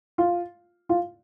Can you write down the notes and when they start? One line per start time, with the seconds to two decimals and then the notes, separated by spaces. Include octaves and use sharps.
0.18 F4
0.89 F4